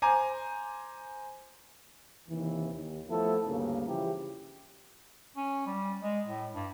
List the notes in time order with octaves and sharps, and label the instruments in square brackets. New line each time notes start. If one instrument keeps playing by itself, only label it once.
[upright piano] C5 G#5 A#5 D6
[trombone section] D#2 C3 E3
D#2
F3 A3 B3 E4 A4
D2 G2 C#3 A#3
C#3 E3 F3 E4 G4
[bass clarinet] C#4
G3
G#3
A2
G2